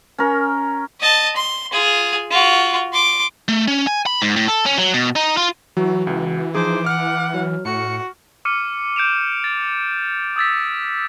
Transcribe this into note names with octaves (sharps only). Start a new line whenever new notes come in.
C#4 A#4
D#5 A5
C6
F4 G#4
F4 F#4
C6 D6
A3
C#4
G#5
B5
G#2
A2
A4
C#4
F#3
B2
D#4
F4
E3 F#3 F#4
C#2
F3 D#4 G#4 C5 D6
F#5 F6
F#3
A2 F#4 C#7
D6 F6 C#7 D#7
G6 D7 E7 F7
A6
D#6 E6 A6 B6